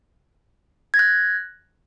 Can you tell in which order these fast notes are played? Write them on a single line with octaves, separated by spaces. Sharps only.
G#6 A#6 F#6